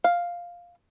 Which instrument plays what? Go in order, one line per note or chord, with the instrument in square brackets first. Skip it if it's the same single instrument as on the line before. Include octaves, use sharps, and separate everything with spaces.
[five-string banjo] F5